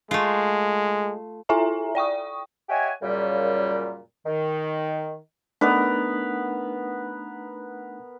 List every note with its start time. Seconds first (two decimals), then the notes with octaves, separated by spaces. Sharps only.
0.11 G#3 A3 F4
1.49 E4 F4 A4 E5 G#5 A#5
1.95 D5 G5 C#6 D#6
2.69 G4 C#5 D#5 E5 F#5 G#5
3.02 F#2 A#2 C#3 G3
4.26 D#3
5.61 A3 B3 D4 D#4 A#4 B4